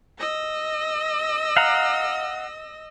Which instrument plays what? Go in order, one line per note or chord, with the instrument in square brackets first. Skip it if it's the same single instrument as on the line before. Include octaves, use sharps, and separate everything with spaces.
[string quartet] D#5 E6 A#6
[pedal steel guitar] F5 F#5 A#5